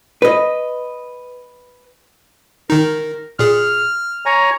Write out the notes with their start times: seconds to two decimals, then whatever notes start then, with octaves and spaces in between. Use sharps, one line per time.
0.22 B4 D#5
2.70 D#3 D#4 A#4
3.39 A#2 G#4 F6
4.26 C#5 G#5 A#5